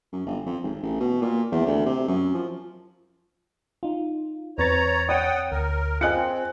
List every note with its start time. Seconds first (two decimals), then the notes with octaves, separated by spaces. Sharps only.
0.13 F#2
0.26 G1
0.46 F2
0.64 G#1
0.83 A1
1.00 B2
1.22 A#2
1.52 E2
1.67 D2
1.86 C3
2.08 F#2
2.35 F3
3.83 D#4 F4
4.58 E2 C4 B4 C#5 A#5 A6
5.09 C#5 F#5 G5 D#6
5.52 D2 A#4
6.01 C4 F4 G#4 D#5 G#5 F#6 C#7